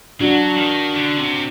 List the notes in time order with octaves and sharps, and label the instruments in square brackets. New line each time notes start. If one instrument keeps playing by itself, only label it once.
[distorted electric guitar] F#3 [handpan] D4 F#4
[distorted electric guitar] D#3
D3
C3